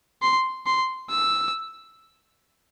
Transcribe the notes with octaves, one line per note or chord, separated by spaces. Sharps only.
C6
C6
E6